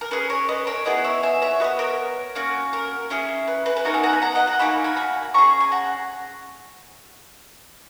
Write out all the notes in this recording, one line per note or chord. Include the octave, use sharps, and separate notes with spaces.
A#4
C#4 G#4 B4
A#4 C#5
B4 D#5
A#4 C#5
B3 E4 G#4 B4 D#5
C#5 E5
E5 G#5
C#5 E5
B3 F#4 B4 D#5
A#4 C#5
A#3 C#4 F#4
A#4
C#4 E4 G#4
B4
B4
B4
B3 D#4 F#4 A#4 C#5
E5 G#5
F#5 A#5
G#5 B5
F#5 A#5
D#5 F#5
F#5 A#5
A#3 D#4 F#4 G#5 B5
G#5 B5
G#5 B5
C#4 G#4 A#5 C#6
G#5
F#5 A#5